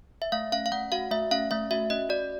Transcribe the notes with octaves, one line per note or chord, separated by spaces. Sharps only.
E5
A3 F5
C#4 F5
F5
A3 F#5
F#4 F5
A3 E5
C#4 F5
A3 E5
F#4 E5
C#4 D#5
F#4 D5